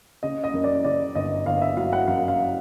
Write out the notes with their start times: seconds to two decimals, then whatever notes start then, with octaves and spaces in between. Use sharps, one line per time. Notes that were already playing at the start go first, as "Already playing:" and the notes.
0.23 C#3 D#5
0.44 D#5
0.54 F#2
0.64 D5
0.84 C#3 D5
1.15 G1 D#5
1.46 G1 F5
1.61 E5
1.77 F#3 F5
1.93 F#5
2.08 F#2 F5
2.28 F5